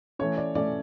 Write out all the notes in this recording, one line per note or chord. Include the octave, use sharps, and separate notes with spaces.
E3 A3 C#4 C#5
D5
E3 A3 C#4 D5